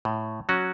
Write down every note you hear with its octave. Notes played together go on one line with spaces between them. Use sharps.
A2
F#3 C#4 F#4